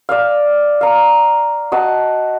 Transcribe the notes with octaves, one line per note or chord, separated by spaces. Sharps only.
D5 F5
F5 A#5
F#4 D#5 A5